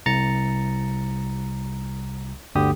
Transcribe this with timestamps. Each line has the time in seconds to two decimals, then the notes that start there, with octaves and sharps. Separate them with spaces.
0.06 C2 A#5 A6 C#7
2.55 G1 D2 D3 G4 D#6